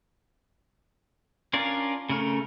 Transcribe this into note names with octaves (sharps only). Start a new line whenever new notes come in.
C#4 D4 F4 A#4 D5
C#3 A3 A#4